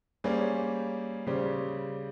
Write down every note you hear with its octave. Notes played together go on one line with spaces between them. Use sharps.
G3 A#3 C#4 G#4 C5
C#3 G3 C#4 G4 C5